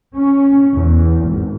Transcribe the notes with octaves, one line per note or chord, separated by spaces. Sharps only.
C#4
E2
G#1